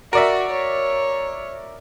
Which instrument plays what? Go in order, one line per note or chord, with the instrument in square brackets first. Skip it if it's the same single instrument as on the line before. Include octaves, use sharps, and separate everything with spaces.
[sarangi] F#4 [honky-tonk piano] A#4 D5 E5
[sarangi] C#5